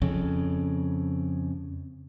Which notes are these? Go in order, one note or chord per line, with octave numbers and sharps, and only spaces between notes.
F2 C#3